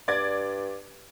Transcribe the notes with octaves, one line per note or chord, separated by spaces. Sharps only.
G2 D5 G#6